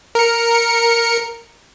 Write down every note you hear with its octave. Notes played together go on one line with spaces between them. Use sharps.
A#4 C#7